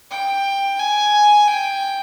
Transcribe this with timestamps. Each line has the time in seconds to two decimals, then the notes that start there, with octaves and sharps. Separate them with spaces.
0.11 G5
0.79 G#5
1.48 G5